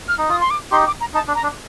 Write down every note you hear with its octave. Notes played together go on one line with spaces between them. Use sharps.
F6
D#4
F4 D#6
C6
D6
D#4 G4 C6
D6
A#5
D#4 A5
D4
A#5
D4